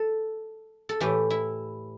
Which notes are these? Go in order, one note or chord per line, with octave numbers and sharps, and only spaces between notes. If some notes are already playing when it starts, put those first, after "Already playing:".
Already playing: A4
A4
A2 E3 G4
E4